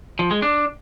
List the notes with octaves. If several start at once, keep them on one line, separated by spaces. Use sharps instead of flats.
F3
G#3
D4